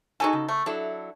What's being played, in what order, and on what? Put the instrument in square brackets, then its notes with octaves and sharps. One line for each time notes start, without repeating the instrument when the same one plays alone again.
[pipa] D#4 F#4 A4 [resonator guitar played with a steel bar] G#4 G#5
[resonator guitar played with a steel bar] C#3
[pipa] A3
[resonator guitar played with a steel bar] F#3 E4 A4 [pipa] D4